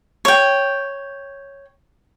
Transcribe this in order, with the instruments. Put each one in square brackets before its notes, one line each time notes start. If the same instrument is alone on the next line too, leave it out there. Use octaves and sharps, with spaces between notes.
[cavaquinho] C#5 G5